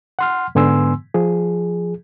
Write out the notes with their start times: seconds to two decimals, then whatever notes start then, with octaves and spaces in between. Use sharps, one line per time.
0.19 F#5 C6 F6
0.55 G#2 D3 B3 G#5 C6 E6
1.14 F3 G#4